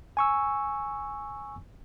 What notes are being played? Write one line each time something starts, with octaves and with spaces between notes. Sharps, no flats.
G#5 C#6 E6